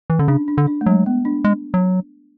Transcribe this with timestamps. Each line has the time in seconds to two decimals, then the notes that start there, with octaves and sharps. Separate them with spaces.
0.10 E3
0.19 D3 C#4
0.28 C#3 D4
0.48 D4
0.58 D3
0.67 D4
0.81 A3
0.86 F#3 G#3
1.06 B3
1.25 D4
1.44 G#3
1.74 F#3